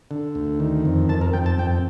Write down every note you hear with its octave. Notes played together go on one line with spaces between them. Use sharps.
D3
D2
D#3
F2
F2 A5
A#4
F2 G5
A5
F2 G5